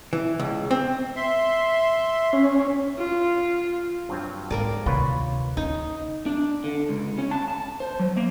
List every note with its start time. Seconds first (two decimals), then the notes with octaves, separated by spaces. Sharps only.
0.13 E3
0.39 C#2
0.71 C4
1.16 E5 C6
2.33 C#4
2.98 F4
4.09 G2 F#3 C4
4.51 G#2 A#3 A#4 D5
4.86 D2 C3 D#3 F4 B4 C#5
5.57 C#4 D#4
6.26 D4
6.64 D3
6.89 C#2
7.18 C#4
7.31 A5
7.48 A5
7.80 C5
8.00 F#3
8.16 A#3